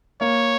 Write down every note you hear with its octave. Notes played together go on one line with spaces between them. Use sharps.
A#3 C#5